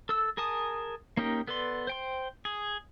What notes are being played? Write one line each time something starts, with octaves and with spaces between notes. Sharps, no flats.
A4 E6
G#4 A#4 G#5 A5 D#6
A#3 C#4 D#4 G4 A#4
B3 A4 B4 D5 C6
C5 G5 C6
G#4